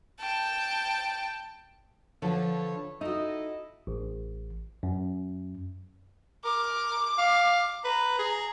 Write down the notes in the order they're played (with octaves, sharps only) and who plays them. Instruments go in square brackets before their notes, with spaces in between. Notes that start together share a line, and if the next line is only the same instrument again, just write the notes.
[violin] G5 A5
[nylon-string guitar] D3 F3 [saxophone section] A4 B4 C#5
[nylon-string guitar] D#4 F#4 [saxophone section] E4 A4 D#5
[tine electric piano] A1
F#2
[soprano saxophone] A#4 [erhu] D6
[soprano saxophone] F5
[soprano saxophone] B4 [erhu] A#5
[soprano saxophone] G#4